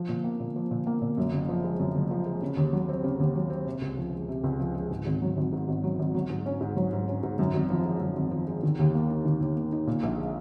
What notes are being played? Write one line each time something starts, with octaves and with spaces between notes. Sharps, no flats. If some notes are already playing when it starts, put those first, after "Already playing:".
Already playing: F3
A#2
A#3
A#2
F3
A#2
A#3
A#2
F#2
F#1
F3
G#3
F#2
F#1
F3
G#3
C#3
D#2
F#3
C4
C#3
D#2
F#3
C4
C3
C#2
F3
G#3
C3
C#2
F3
G#3
G#2
G#1
F#3
G#1
G#2
G#1
F#3
G#1
F#3
G#2
C#4
G#2
F#3
G#2
C#4
G#2
F#2
G#1
F3
G#3
F#2
G#1
F3
G#3
D#3
D#2
A#3
D#4
D#3
D#2
A#3
D#4
A#2
A#1
G#3